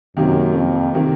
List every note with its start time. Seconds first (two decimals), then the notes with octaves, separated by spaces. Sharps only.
0.17 F#2 C3 D#3 A#3
0.55 F2
0.94 C3 D#3 A#3